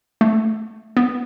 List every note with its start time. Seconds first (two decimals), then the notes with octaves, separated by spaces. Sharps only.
0.21 A3
0.97 B3